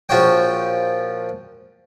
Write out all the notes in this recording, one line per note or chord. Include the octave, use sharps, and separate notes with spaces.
A#1 F3 F4 F#4 C#5 G5